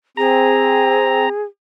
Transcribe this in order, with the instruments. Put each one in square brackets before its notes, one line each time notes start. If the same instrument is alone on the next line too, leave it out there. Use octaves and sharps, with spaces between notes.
[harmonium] C4 [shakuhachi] G#4 [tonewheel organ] A#5